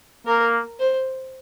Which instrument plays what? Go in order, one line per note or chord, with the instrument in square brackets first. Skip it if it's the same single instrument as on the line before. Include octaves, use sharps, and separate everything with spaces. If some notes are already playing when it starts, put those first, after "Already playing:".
[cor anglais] A#3 [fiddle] A#4
[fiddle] C5